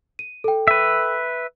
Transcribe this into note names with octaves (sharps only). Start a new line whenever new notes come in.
D#7
A4 G5
B4 E5